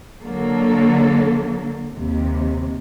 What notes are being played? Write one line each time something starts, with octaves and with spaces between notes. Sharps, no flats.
D3 F#3 A#3 A4
D#2 C3